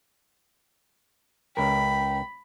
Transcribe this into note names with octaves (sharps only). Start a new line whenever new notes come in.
C#2 A#4 G5 B5